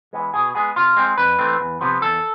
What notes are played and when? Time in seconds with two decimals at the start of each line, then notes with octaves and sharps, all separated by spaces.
0.13 E3 G#3 B3
0.34 B2 G#4
0.54 G#3 B3 G#4
0.76 C3 F4
0.97 G#3 C4
1.18 F2 B4
1.39 E3 A3 C4
1.61 E2
1.81 C3 F3 B3
2.02 E2 A4